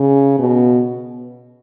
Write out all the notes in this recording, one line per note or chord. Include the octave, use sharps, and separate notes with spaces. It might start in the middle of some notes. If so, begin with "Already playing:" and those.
Already playing: C#3
B2